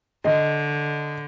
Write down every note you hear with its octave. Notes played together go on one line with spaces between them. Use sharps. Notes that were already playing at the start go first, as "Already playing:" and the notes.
D3 D#5